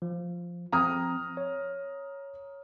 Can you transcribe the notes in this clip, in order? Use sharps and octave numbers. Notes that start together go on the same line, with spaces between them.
F3
F3 C4 A#5 D#6 F6
C#5